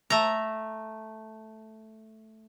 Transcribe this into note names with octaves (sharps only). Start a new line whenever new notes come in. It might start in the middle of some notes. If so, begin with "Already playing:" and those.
A3 A#5